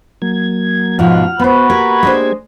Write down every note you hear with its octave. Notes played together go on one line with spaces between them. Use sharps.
F#3 A#3 G#6
G#2 B2 F3 F#5 F6
B3 F#4 B4 C5 B5
A#3 G4 A#4 G#6
G#3 D4 C5